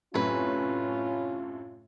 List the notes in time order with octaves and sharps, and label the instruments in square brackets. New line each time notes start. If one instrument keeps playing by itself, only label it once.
[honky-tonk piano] F#2 A2 C3 [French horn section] C#4 F4 [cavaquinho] B4 G#5